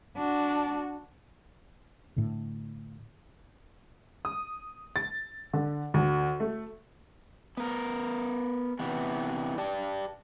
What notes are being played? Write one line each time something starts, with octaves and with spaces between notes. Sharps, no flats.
D4 F#4
A2 D3
D#6
A6
D3
D2
A3
B3 A#4
C3 E3 B3
G4 D5 G5 A5